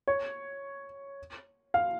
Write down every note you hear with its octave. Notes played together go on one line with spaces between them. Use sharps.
C#5
F5